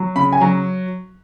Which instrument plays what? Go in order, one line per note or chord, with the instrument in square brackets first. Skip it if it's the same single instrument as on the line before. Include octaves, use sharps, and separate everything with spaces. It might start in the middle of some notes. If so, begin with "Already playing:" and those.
Already playing: [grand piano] F#3
C#3 B5
G#5
F#3 A#5